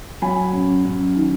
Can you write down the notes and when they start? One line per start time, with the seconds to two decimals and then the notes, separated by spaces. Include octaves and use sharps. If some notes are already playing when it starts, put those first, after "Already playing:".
0.22 F#3 G#5 B5
0.53 F#2
0.85 F#2
1.16 D#3